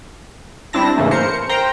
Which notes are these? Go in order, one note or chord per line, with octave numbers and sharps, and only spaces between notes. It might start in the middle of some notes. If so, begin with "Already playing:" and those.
G3 C4 D4 E4 A5 A#6
G#2 C#3 E3 A3 A#3
A#4 C5 C#7
A#4 C5 G5 A#5